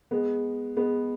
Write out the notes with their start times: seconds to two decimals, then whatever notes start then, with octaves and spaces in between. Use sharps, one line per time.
0.11 G#3 B3
0.76 G#3 B3